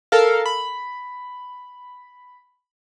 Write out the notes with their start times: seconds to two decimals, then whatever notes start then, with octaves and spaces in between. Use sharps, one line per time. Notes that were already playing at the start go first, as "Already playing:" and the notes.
0.12 A4 A#4 F5
0.46 B5